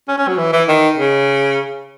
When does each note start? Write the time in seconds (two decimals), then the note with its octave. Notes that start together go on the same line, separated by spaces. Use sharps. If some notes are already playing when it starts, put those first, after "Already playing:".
0.08 C#4
0.18 C#4
0.28 F#3
0.38 E3
0.53 E3
0.68 D#3
0.98 C#3